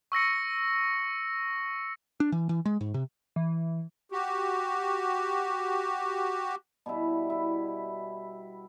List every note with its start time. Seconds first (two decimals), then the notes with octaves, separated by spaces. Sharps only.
0.12 C#6 E6 A#6 C#7
2.20 D4
2.32 E3
2.49 E3
2.66 G#3
2.81 G#2
2.94 C3
3.36 E3
4.12 F#4 G4
6.86 B2 G3 E4
7.30 E4